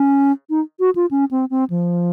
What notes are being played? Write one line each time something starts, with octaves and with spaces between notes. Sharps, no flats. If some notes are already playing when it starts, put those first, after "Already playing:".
Already playing: C#4
D#4
F#4
F4
C#4
C4
C4
F3